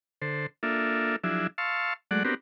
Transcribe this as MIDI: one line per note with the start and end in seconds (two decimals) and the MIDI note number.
0.22 0.46 50
0.22 0.46 69
0.22 0.46 72
0.63 1.16 58
0.63 1.16 62
0.63 1.16 65
0.63 1.16 69
0.63 1.16 76
1.24 1.47 53
1.24 1.47 54
1.24 1.47 62
1.24 1.47 64
1.24 1.47 68
1.24 1.47 76
1.58 1.93 77
1.58 1.93 81
1.58 1.93 84
1.58 1.93 85
1.58 1.93 88
2.11 2.23 54
2.11 2.23 56
2.11 2.23 57
2.11 2.23 74
2.11 2.23 78
2.25 2.34 59
2.25 2.34 60
2.25 2.34 62
2.25 2.34 66
2.25 2.34 67
2.25 2.34 70